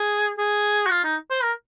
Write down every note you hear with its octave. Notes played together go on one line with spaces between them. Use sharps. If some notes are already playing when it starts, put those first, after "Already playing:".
Already playing: G#4
G#4
F#4
F4
D#4
C5
A#4